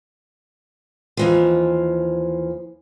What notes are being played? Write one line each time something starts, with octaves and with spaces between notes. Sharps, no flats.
D#2 E3 F3